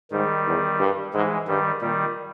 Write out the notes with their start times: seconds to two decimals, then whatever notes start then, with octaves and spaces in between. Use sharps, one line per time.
0.11 G#2 D#3 G3
0.46 E2
0.80 G2
1.14 G#2 E3 G#3
1.47 G2 D#3 G3
1.81 A#2 D#3 G3